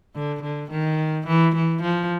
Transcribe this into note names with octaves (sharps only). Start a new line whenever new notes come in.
D3
D3
D#3
E3
E3
F3